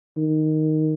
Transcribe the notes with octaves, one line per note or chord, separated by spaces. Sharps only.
D#3